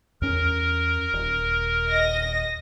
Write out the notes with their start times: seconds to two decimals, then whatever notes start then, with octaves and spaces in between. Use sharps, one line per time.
0.22 E2 C#4 A#4
1.13 D#1
1.89 D#5 A#6